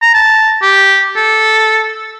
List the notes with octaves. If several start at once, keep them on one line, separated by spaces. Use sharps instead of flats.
A#5
A5
G4
A4